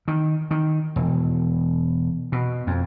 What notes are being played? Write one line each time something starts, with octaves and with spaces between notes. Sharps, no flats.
D#3
D#3
E1
B2
F2